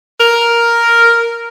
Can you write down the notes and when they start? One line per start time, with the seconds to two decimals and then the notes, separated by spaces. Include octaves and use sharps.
0.20 A#4